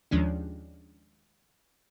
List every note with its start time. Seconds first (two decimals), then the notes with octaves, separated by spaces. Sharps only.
0.11 D#2 D#3 F3 G#3 C#4 D4